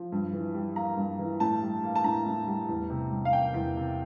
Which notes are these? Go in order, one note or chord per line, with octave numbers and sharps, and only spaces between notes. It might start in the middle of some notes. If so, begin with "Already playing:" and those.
Already playing: F3
G2
E3
G3
A#3 A#5
G2
E3
A2 A5
G3
A#3
A5
A2 A#5
A2
G3
E2
C3
G3
F5
A#3 G5
E2
C3